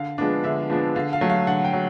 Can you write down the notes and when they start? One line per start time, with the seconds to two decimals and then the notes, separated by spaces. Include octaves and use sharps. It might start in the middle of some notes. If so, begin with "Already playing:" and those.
Already playing: D3 F5
0.18 F3 G#3 B3 D4
0.44 D3 E5
0.70 F3 G#3 B3 D4
0.95 D3 F5
1.13 F5
1.21 F#3 A3
1.30 F5
1.47 D3 F#5
1.65 G5
1.73 F#3